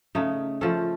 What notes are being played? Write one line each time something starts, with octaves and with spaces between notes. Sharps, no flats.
C#3 A3 D#4
F3 A3 C#4 A4